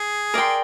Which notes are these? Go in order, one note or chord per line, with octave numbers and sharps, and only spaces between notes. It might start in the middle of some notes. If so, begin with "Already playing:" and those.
Already playing: G#4
A#4 D5 G5 C6